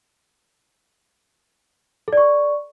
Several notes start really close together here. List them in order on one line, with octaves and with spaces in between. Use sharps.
A4 D5 C#6